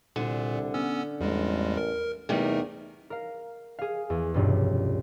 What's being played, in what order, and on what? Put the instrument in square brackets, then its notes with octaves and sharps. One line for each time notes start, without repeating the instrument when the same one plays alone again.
[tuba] C2 [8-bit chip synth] A#2 [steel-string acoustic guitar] D3
[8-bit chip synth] B3 C#4 E6
[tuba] A1 [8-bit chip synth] E2 G3 G#3
[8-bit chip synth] A#4
[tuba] E2 [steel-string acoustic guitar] C3 G3 D#4 [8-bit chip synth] A3 A#4
[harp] A#4 F5
G#4 F5
E2
F1 C#2 G2 B2